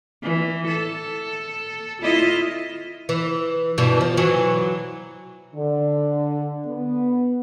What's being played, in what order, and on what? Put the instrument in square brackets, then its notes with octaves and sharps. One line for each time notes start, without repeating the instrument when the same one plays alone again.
[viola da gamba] E3
A4
E4 F4 D#5
[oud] E3
G2 B2 E3
F3
E3 F#3
[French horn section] D3
B3